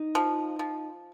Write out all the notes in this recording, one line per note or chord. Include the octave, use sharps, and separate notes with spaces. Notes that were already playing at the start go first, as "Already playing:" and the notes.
Already playing: D#4
F3
F3